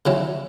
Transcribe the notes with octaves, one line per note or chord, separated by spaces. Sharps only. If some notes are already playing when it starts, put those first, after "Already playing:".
C#3 F#3 C#4 E4